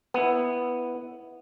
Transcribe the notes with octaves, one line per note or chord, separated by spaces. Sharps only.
B3 E4